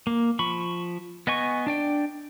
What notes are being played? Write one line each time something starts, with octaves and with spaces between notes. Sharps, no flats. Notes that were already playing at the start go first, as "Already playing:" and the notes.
A#3
F3 B5 C#6
B3 D#5 G#5 C#6
D4 D5 G5